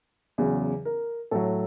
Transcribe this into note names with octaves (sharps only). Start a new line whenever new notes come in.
E2 C#3 F#3
A#4
A2 F#3 A4